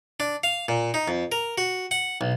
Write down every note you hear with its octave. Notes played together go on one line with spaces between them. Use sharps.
D4
F5
A#2
D#4
F2
A#4
F#4
F#5
B1